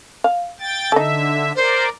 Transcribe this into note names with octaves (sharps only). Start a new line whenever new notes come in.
F5
G5 A6
D3 D#4 A4 E5
A#4 C5 D5